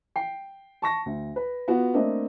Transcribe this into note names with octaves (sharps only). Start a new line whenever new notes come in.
G5 C7
A5 C#6 A#6
D2
B4
B3 F4 F#4
A3 A#3 C4 D4 D#5